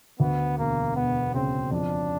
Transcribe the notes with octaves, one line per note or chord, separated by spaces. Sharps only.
D2 B3
E1 A#3
E1 B3
C#3 C4
F2 D4